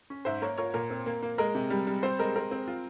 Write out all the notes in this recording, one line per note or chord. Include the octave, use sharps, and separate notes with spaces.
C#4
G#2 C5 E5
A#3 A#4 C#5
F4 A#4 C#5
A#2 A#4
C4
A#3
A#3
G#3 A#4
C3
G3
G3
C4 C5
G#3 A#4
C4 A#4
C4
F4